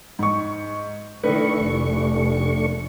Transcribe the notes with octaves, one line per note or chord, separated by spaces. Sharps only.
G#2 C#6
D#3 A3 D4 E4 B4 C#6
F1